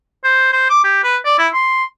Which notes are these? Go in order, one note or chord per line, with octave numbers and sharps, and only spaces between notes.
C5
C5
D6
G4
B4
D5
E4
C6